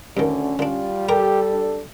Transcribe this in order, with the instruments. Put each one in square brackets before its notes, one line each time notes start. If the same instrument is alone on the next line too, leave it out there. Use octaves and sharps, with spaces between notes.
[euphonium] D2 [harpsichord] G2 D#3 [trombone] D3 [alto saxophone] C#4
[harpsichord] D3 D4 [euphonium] G3 [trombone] F4
[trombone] G4 [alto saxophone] A4 [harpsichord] A#4 D5 A#5
[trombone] D4